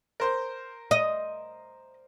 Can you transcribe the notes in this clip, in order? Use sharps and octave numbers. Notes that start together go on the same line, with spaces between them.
A#4 C5 G6
D#5